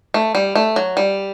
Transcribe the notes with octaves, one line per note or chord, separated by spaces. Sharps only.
A3
G3
A3
F#3
G3